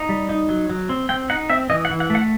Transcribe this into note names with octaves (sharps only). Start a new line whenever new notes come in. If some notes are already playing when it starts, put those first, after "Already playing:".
Already playing: D#4
G3
D#4
F#3
F#3
C4
C4 G5
D#4 F#5
C4 E5
E3 D#5
F#5
E3
F#5
A3
F#5